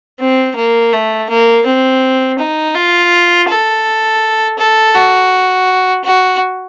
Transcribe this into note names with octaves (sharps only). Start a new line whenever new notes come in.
C4
A#3
A3
A#3
C4
D#4
F4
A4
A4
F#4
F#4